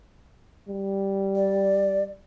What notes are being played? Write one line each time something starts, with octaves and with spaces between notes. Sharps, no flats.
G3
D5